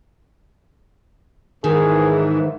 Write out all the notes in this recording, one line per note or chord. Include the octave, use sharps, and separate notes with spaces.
G#2 D#3 E3 G#4